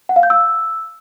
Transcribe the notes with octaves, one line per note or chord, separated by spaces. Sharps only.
F#5
F5
G6
E6